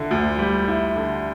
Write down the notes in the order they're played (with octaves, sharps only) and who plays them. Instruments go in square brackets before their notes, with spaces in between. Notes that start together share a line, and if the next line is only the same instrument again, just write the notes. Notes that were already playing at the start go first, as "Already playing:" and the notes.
Already playing: [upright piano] D3 E4
D2
G3
E4
D3